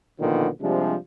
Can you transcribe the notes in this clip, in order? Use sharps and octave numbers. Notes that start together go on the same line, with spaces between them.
B1 A#2 D3 D#3 F3 B3
C3 F3 G3 G#3 D4